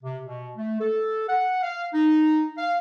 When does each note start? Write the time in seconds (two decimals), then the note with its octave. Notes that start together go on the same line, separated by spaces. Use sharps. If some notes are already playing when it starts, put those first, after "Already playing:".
0.03 C3
0.26 B2
0.56 A3
0.80 A4
1.29 F#5
1.63 F5
1.93 D#4
2.58 F5